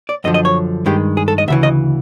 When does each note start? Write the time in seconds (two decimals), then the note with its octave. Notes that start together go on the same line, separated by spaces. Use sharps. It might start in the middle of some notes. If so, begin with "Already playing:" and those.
0.09 D5
0.24 F#2 D3 F3 D#5
0.34 D#5
0.45 C#5
0.86 G2 D#3 G#3 G4
1.17 G#4
1.28 A4
1.38 D#5
1.48 D2 C#3 E3 E5
1.63 D#5